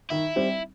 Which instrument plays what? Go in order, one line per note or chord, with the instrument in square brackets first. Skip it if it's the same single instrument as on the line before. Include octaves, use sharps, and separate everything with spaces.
[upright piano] D#3 [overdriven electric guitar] E4
[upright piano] G3 C4